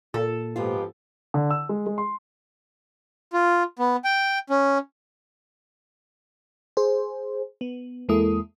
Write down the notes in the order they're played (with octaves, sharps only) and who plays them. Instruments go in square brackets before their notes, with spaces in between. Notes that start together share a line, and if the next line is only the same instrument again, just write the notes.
[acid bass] A#2 [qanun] A4
[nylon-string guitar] F2 G#2 F4 [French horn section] F3 B3 G4
[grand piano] D3
E6
G#3
G#3
C6
[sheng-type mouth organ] F4
B3
G5
C#4
[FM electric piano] G#4 C5
B3
E2 G#3 A#3 E4 A4 D#6